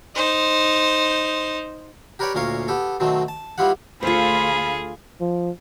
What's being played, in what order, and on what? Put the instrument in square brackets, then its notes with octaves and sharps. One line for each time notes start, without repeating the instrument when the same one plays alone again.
[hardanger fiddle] D#4 C5
[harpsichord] G4 A#4 B4 C#5 D5 G5
D2 A#2 C#4 A#4 C#5 F5
B3 G4 A4
B2 D#3 F#3 A3 C4
A5
G3 B3 E4 F4 G4 F#5
[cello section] D2 A4 F5 [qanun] F4 C5 [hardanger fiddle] G#4 [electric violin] B5
[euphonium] F3